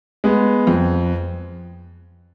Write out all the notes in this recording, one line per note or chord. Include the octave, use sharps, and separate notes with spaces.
G#3 B3
F2